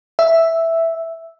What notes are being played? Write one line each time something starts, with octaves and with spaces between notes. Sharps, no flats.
E5